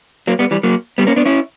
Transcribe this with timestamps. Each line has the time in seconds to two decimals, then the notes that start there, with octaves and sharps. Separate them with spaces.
0.27 F#3 A#3
0.39 G3 B3
0.51 E3 G3
0.63 F#3 A#3
0.98 G3 B3
1.07 A#3 C#4
1.16 B3 D4
1.26 C#4 E4